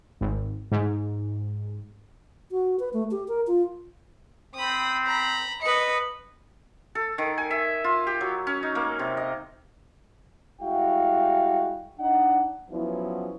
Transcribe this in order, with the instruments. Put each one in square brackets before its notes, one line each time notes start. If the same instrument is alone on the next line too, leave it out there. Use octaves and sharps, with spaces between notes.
[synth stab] G#1
G#2
[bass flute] F#4
B4
A3
G4
A#4
F4
[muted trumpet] C4 [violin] B5 D#6
[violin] A#5 B5
[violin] B4 C#7 [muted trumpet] D#5
[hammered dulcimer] A4
D#3
G#5
E5
F4
G4
F#3
C#4
D#4
A#3
C3
D#5
[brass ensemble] G3 G#3 E4 F#4 F5 G5
D4 D#4 F#5
F3 F#3 B3 C#4 E4